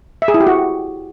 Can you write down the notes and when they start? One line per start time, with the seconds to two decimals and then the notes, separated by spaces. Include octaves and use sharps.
0.22 E5
0.28 G#4
0.34 E4
0.41 G4
0.47 F#4